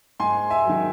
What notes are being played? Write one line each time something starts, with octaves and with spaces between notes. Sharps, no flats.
G#2 G#5 C6
E5 G#5
D#3 F#3